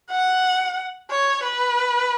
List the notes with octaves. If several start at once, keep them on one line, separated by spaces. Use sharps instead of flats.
F#5
C#5
B4